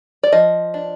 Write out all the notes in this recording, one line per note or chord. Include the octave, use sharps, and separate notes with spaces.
D5
F3 D#5
D4